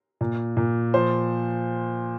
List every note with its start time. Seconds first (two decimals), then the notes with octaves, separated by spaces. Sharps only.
0.21 A#2
0.57 A#2
0.94 F3 C5